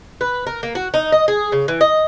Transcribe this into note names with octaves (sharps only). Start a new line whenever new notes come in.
B4
A#4
A#3
F#4
D#4
D#5
G#4
C#3
E3
D#5